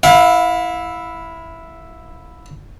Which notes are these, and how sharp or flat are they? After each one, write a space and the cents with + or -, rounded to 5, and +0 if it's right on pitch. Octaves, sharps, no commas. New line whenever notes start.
E4 +0 F5 +35